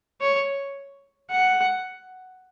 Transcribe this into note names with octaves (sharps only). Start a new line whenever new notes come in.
C#5
F#5